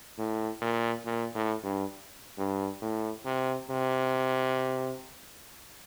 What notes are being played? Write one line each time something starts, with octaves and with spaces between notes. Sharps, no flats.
A2
A#2
A#2
A2
G2
G2
A2
C3
C3